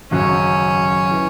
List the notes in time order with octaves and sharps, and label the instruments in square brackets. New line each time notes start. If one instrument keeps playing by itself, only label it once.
[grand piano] G#1 F#2 C#3 F#3 [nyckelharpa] C#4
[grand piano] E3